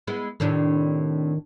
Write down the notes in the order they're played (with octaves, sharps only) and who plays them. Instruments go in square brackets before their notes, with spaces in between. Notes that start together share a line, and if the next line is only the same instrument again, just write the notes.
[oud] G#3 B3 E4
[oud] A2 C3 D4 [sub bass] D#3